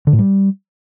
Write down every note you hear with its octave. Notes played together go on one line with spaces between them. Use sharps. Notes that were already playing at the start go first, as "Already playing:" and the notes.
D3
A2
G3